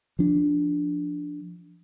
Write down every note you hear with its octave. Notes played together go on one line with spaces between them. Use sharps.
F3 D4